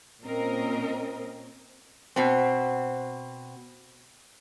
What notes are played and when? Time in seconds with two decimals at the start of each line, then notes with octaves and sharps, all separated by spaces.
0.23 A#2 C4 C#4 A#4 D#5
2.16 B2 C4